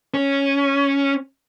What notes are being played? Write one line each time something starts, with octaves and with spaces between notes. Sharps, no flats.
C#4